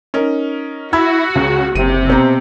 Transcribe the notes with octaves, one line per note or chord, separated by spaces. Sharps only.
C#4 D#4 A#4
E4 F#4 B5 E6 G#6
C#2 C#3
F#1 C3 D#7
B2 C4 A#5